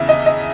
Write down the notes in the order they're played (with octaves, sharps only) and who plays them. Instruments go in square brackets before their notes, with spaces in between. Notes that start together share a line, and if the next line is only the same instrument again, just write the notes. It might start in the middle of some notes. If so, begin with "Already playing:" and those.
Already playing: [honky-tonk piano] E2 C#3 E3 E5
D#5
D#5